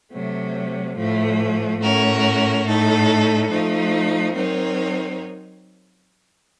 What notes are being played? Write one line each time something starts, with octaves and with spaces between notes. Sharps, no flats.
C3 F#3 A3
A2 F3 A3
A2 A3 C#4 F#4 A#4
A2 A3 D#4 A4
F3 A3 D#4
F#3 C4 D#4 A#4 C#5